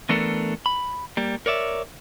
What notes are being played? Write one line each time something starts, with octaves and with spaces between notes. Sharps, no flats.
E3 A3 B3 D4 A4 A#4
B5
G3 A#3
A#4 C#5 D5 E5